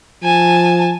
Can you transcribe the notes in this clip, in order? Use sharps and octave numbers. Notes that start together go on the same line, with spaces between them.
F3 G#5 A5